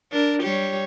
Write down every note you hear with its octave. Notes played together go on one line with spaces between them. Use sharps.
D4 A#4
G3 G4 C#5